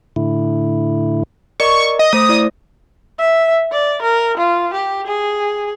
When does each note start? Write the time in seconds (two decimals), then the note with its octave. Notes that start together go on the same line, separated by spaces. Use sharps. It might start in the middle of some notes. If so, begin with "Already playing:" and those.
0.16 A2 D3 E4
1.60 A#4 D5 D#5 C#6
1.99 D#5
2.13 A3 C5 D#6 A#6
2.29 E4 D5
3.19 E5
3.72 D5
4.02 A#4
4.38 F4
4.74 G4
5.07 G#4